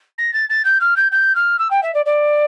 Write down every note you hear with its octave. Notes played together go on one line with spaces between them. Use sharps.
A#6
A6
A6
G6
F6
G6
G6
F6
E6
G5
E5
D5
D5